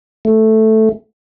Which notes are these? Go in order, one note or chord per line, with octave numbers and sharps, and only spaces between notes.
A3